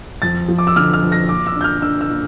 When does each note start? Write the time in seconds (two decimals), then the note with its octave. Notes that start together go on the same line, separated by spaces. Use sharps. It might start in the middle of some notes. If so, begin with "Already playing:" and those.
0.22 F2 A6
0.48 F3
0.58 D6
0.67 E6
0.76 D3 F6
0.93 F6
1.03 F2
1.12 A#6
1.29 A#2 D6
1.47 E6
1.56 D4 G6
1.64 F6
1.82 D4 E6
2.01 E6
2.09 A#2